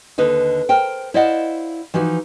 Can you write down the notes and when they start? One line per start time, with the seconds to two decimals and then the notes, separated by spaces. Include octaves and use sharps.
0.18 D#2 D3 D#4 B4
0.69 A#4 C5 G5
1.14 E4 C5 D5 D#5 F5 F#5
1.94 E3 F3 D#4 F#4